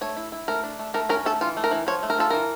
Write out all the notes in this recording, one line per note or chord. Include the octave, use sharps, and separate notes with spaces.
A3 C#5
E4
E4
A3 A#4
D4
A3
A3 A#4
C#4 A#4
A3 A4
E3 F4
A3
A#4
E3
F3 C#5
A3
A#4
F4 A4
E3 A#4